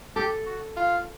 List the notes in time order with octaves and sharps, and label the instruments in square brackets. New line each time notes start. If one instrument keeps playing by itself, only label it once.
[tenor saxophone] G4 [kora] A4
[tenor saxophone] F#4
F4